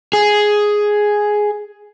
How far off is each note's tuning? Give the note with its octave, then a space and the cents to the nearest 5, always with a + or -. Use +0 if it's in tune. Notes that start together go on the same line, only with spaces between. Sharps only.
G#4 +5